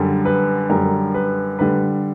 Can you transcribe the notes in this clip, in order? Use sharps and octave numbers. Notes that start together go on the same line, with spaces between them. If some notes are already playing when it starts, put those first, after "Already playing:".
Already playing: F#2 D3 G3
B4
F#2 D3 G3 A#4
B4
D3 G3 B4